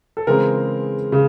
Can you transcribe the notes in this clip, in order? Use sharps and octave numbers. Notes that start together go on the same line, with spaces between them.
A4
C#3 E3 G#3 C4 A#4
C#3